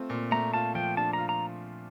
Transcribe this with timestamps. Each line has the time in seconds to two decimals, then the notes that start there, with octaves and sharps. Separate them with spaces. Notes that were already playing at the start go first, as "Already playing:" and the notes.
Already playing: A3 C4 F4
0.10 A#2
0.31 A3 A#5
0.54 F4 A5
0.75 F3 G5
0.97 D4 A5
1.13 F4 A#5
1.29 A#5